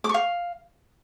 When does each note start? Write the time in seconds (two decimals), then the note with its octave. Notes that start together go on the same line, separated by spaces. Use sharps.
0.04 D6
0.09 C#6
0.14 F5